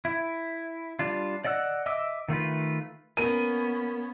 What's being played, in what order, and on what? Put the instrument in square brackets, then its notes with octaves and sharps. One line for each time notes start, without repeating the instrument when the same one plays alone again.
[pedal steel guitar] E4
G3 D4 F4
D5 D#5 F#5 E6 F#6
D#5 E5 D6 E6
D#3 A3 F4 B4
[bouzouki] A#3 [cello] B3 C#4 [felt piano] D#7